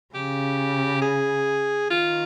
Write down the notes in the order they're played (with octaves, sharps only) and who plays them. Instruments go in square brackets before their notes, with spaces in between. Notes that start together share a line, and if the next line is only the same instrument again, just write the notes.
[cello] C#3 [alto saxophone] G4
[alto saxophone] G#4
[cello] D#3 [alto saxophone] F4